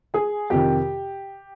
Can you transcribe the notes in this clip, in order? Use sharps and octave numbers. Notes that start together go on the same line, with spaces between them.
G#4 G#5
F2 C3 D#3 G4 G5